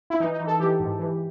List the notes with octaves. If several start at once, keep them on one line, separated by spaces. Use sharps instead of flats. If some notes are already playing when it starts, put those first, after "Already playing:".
E4
E3 D#4
D#4
E3
A4
E3 G4
G#2
E3